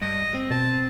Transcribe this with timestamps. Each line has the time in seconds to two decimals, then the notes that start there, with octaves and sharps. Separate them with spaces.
0.02 G2 D#5
0.34 C4
0.51 B2 A5